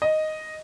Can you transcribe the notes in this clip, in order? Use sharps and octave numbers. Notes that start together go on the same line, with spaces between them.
D#5